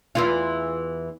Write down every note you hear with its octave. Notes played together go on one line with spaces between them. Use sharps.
E2 E3 F4